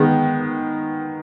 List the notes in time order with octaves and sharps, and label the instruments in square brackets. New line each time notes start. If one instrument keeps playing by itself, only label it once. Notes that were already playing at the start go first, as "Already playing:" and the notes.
Already playing: [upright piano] D#3 G#3 B3